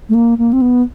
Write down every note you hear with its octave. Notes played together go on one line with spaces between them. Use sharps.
A3
A#3
A#3
C4
B3